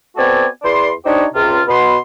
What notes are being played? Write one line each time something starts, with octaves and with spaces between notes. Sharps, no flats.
B3 C4 F#4 A4 D5 G#5
E2 E3 B4 D5 C6
D4 D#4 G4 C5 C#5 D#5
C#2 C3 F4
B2 B3 C6